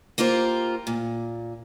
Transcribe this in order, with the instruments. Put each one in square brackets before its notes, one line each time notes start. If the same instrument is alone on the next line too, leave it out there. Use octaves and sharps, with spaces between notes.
[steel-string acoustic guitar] A#3 F4 G4 A#4 C5
A#2